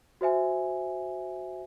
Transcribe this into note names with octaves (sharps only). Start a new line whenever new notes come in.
F#4 C5 E5 G#5